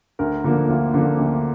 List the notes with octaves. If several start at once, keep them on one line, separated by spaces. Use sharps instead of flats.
D2 A#4
D3 F3 A#3
D2 F4
D3 F3 A#3
D2